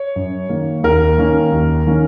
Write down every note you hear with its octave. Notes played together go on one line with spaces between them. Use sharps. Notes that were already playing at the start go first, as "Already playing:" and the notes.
Already playing: C#5
F#2
D#3 A#3
D#2 A#4
D#3 A#3 C#4
D#2
D#3 A#3 C#4